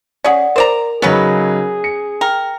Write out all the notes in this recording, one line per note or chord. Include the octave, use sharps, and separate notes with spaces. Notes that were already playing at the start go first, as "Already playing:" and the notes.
C#4 G#4 D5 F#5
A#4 C5 D5 A#5
C#3 F#3 B3 C#4 D#4 G#4 B4
C#7
A#4 G5